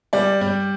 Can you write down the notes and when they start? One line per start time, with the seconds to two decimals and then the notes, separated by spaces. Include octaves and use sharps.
0.13 G3 D5
0.41 G3